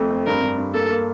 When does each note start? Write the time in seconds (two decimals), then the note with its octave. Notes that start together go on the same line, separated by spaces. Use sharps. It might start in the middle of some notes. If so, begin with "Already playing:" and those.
Already playing: F2 A3
0.11 C4
0.26 G2 A#4
0.42 G2
0.58 G2
0.74 A#3 A4
0.90 A#3